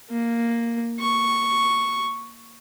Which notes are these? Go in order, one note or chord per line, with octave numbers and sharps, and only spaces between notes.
A#3
C#6